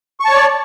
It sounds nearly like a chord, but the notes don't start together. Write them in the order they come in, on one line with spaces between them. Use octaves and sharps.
C#6 A5 C#5 D5